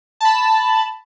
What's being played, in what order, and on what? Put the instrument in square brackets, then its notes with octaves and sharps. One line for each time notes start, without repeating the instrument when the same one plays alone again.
[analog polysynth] A5 B5